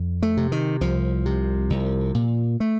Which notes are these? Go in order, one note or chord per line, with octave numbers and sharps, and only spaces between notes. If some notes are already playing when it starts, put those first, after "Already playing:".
Already playing: F2
A3
C3
D#3
C2 F3
C3
C2
A#2
A3